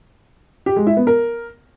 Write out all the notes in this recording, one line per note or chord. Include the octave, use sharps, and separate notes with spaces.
G4
G#3
E4
B3
A#4